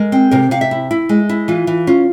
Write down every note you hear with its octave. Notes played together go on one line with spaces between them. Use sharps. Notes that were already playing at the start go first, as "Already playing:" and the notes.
Already playing: G#3 A#4
C4
C3 A#4
C3 F5
E5
E4
E4
G#3
E4
E3 F4
E3
C#4 F4